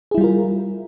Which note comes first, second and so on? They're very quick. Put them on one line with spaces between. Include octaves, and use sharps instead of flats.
G#4 E4 G3 F4 A#4